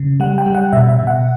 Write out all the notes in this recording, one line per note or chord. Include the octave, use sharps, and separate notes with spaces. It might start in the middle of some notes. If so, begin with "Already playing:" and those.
Already playing: C#3
G3 F#5
G5
G3
F#5
B2 E5
E5
B2
F#5